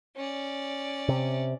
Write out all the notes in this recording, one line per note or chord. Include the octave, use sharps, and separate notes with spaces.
C#4 D5
C3